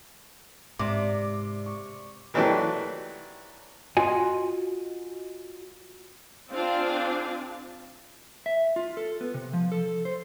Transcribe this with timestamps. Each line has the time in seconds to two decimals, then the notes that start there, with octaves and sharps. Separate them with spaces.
0.79 G#2 C3 D5 D6
1.66 C#6
2.34 D#3 E3 F#3 A3 D4 G4
3.97 F4 F#4 D#5 G#5
6.52 C4 D4 F4 G#4 F5
8.46 E5
8.76 F4
8.97 A4
9.21 B3
9.34 C3
9.53 F3
9.72 A4
10.05 C5